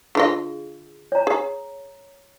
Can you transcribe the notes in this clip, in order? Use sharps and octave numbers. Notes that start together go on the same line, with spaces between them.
D3 F4 G#4 D#5
C#5 A#5
G#4